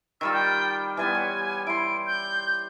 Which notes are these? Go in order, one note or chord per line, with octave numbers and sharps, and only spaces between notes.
D#3 G3 F4 E6
G5
E3 G3 B3 G#5
C#5
E4 C6 D7
G6